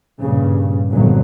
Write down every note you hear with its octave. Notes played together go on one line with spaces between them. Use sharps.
G2 A#2 C#3
G1 F2 A#2 F#3